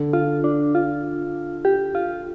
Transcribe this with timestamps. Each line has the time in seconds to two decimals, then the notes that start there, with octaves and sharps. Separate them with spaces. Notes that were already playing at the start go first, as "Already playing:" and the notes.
Already playing: D3
0.13 F4
0.44 D4
0.75 F4
1.65 G4
1.95 F4